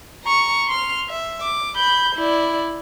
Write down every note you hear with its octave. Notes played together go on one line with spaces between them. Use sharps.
A#5 C#6
C6 F6
E5
D6
B5 G6
E4 D5